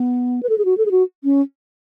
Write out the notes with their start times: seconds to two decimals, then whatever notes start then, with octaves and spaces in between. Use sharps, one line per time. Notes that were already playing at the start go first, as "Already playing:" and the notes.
Already playing: B3
0.43 B4
0.49 A4
0.58 G#4
0.65 F#4
0.77 A4
0.86 G#4
0.91 F#4
1.24 C#4